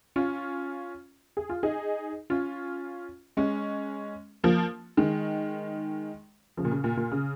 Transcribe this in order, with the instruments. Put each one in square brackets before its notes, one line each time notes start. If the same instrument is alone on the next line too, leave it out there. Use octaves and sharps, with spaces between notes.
[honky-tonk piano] C#4 F4
G#4
F4
D#4 G#4
C#4 F4
G#3 C#4
F3 A#3
D#3 G#3
C#3 F3
A#2
C#3
A#2
A#2
C#3